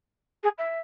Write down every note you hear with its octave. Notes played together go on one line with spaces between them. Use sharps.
G#4
E5